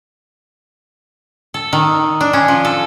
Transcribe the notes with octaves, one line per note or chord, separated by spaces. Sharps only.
A4
D#3
D4
C#4
F3
A4